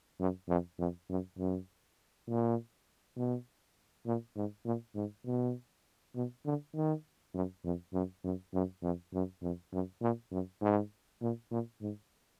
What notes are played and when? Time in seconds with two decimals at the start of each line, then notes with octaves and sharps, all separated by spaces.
0.20 F#2
0.49 F2
0.79 F2
1.09 F#2
1.39 F#2
2.29 A#2
3.17 B2
4.06 A#2
4.36 G#2
4.66 A#2
4.95 G#2
5.26 B2
6.15 B2
6.45 D3
6.75 D#3
7.34 F#2
7.64 F2
7.93 F#2
8.24 F#2
8.54 F#2
8.83 F2
9.13 F#2
9.42 F2
9.72 F#2
10.02 A#2
10.31 F#2
10.61 G#2
11.22 A#2
11.51 A#2
11.81 G#2